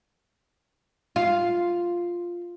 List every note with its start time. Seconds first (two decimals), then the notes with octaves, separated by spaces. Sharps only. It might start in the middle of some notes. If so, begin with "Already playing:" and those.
1.16 F4